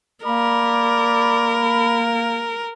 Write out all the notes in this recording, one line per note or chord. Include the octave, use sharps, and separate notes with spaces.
A#3 A#4 D5 B5